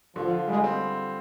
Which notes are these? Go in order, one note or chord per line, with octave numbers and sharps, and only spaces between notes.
D3 F3
F4
G3 G#3
C4